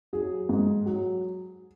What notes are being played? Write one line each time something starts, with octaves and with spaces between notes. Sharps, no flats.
F#3 G#4
G#2
F#3